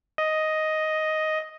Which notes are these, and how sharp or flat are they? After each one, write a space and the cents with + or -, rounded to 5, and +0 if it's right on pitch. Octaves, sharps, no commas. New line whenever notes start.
D#5 +5